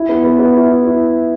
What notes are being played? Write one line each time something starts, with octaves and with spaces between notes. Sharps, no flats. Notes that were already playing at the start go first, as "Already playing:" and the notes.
Already playing: E4
B3
B3
B3
E4
E4
E4